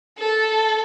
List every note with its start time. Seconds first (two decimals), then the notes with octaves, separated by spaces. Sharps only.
0.19 A4